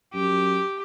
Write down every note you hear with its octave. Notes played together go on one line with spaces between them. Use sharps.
F#2 G4